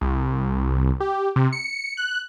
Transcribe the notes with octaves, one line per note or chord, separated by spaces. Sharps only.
C2
G4
C3
C#7
F#6